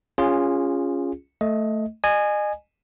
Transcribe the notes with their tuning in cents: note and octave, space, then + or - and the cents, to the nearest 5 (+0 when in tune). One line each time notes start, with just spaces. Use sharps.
C#4 +0 F4 +0 G#4 -20
A3 +5 D#5 +15
D#5 -35 G#5 +0